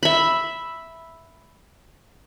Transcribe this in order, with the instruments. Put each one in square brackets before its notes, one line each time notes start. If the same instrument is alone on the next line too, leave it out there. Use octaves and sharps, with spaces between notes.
[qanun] E5 B5